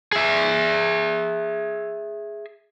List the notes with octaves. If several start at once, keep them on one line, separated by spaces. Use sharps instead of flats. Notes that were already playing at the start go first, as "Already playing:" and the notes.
G#4 E5